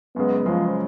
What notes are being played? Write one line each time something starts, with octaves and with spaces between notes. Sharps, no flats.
F#2 C#3 G#3 B3
F#2 C#3 F3 G#3